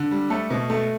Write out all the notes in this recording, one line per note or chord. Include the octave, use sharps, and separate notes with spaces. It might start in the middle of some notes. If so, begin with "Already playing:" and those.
Already playing: D3
G3
A3 A4
B2
A3